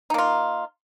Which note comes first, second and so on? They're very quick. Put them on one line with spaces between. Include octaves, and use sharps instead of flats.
D#4 A#3 F4